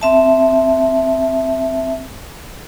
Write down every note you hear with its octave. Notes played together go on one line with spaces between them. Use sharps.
C4 E5 A5